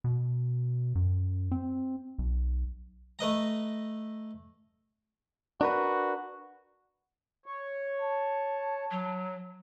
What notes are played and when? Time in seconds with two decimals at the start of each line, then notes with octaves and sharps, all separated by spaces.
0.04 B2
0.95 F#2
1.51 C4
2.19 B1
3.19 A3 B4 D#5 A#5
5.61 D4 F#4 A#4 B4
7.46 C#5
8.02 A5
8.91 F#3